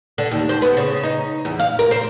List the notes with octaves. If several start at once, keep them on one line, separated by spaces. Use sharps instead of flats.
D3
D#2
C5
B3
C#3
D#4
E2
F5
A#4
C5